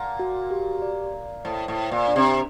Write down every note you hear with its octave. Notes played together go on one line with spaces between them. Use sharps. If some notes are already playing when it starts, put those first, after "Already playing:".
Already playing: A#2 F#5 A5
F#4
G4
D5
D5
A2 C5
A2
C5
A#2
D4
C3